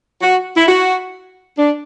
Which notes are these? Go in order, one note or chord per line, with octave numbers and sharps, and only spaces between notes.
F#4
E4
F#4
D4